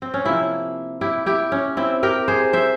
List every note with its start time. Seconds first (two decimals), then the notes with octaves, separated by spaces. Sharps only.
0.02 C4
0.14 C#4
0.25 C3 F3 A#3 C4 E4
1.01 E4 G4
1.26 E4 G4
1.52 C#4
1.77 C4 E4
2.03 G4 A#4
2.28 G#4 C5
2.53 C5 E5